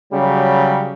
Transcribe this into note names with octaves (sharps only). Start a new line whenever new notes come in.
C#3 F#3 G3